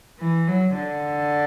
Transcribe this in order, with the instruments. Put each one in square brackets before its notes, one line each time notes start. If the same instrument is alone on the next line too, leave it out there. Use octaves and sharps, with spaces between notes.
[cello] E3
F#3
D3